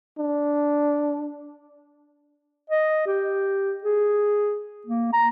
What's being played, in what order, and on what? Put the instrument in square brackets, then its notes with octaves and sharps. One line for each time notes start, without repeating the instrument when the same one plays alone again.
[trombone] D4
[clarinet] D#5
G4
G#4
A#3
A#5